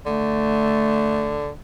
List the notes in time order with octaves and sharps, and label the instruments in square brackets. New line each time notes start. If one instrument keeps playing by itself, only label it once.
[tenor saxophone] D3 [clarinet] A3